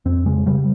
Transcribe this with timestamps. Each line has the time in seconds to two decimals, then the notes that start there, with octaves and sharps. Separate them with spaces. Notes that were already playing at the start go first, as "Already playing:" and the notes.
0.05 F2 C4
0.26 C#3 G#3
0.46 C#3 G3